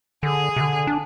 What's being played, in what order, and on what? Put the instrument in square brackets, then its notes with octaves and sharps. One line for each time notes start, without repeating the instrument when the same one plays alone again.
[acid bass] D3 [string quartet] G#4
[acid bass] C3
D3
D4